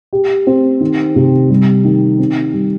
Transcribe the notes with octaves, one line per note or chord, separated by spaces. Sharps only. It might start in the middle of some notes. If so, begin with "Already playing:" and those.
G4
C4
D#3
C3
G3
D#3
C4
G3